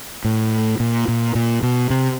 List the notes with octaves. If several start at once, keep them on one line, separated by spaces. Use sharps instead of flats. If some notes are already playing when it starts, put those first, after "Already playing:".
A2
A#2
A#2
A#2
B2
C3